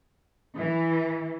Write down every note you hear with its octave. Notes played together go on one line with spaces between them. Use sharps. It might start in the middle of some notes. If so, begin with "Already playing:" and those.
E3